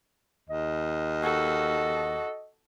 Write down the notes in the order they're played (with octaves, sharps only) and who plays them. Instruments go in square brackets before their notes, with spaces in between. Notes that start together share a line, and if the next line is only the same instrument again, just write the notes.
[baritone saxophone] D#2 [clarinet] D#5
[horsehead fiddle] F#4 A4